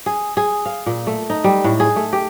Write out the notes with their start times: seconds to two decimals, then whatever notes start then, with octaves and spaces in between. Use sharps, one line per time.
0.06 G#4
0.37 G#4
0.65 F5
0.86 A#2
1.07 A3
1.30 D#4
1.44 G3
1.64 A2
1.80 G#4
1.96 A3
2.13 G4